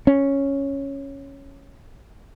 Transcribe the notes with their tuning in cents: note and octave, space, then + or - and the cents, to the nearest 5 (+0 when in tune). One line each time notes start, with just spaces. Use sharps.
C#4 -5